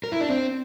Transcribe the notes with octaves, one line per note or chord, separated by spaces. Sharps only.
A#4
E4
D4
C4